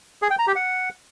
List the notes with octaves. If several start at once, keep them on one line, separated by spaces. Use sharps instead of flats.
G#4
G5
A#5
G4
F#5